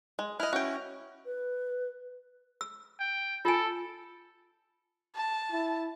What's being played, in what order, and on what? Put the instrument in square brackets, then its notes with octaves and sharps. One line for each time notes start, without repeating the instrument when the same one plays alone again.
[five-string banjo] G#3
[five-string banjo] E4 D#5 [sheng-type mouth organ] F6 F#6
[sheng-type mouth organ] C#4 E4 [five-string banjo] F#4 G5
[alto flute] B4
[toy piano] E6
[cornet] G5
[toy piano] F4 G#5 [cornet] A4
[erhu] A5
[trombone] E4